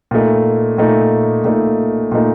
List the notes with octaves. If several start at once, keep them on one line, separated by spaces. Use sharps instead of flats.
A#2 A3 D#4
A#2 A3 D#4
A#2 A3 D#4
A#2 A3 D#4